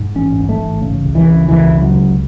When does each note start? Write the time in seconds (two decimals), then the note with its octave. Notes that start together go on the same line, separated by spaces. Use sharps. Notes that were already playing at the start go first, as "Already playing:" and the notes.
Already playing: G#2
0.15 A1 C#4
0.37 G#2
0.49 A3
0.60 A1
0.82 C#3
1.04 C#2
1.15 E3
1.27 C#3
1.48 C#2 E3
1.71 C#3
1.81 F#3
1.94 C#2